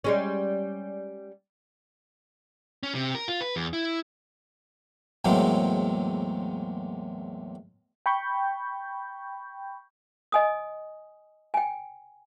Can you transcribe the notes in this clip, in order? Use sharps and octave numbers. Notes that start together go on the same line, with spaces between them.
G3 G#3 C#4
C#4
C3
A#4
F4
B4
E2
E4
E2 A2 F#3 G#3 A#3 C4
G5 B5 C#6 G6
D#5 G#5 D#6
G5 G#5